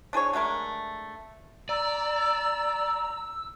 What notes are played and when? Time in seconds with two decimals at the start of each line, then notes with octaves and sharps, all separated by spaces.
0.13 D4 G#4 C5 C#5
0.33 D3 G#3 A3 A#4
1.69 D5 A#5 E6